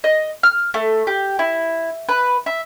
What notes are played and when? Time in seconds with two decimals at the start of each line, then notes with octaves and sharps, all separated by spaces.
0.04 D#5
0.43 F6
0.74 A3
1.07 G4
1.39 E4
2.09 B4
2.46 E5